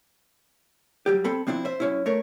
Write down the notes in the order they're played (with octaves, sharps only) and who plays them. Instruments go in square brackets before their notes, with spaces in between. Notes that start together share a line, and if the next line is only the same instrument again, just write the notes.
[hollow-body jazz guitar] F#3 G3 G4
C4 A4 B5
F3 C4 D4 E4
C5 E5
F#2 C#4 E4
A3 A#4 C#5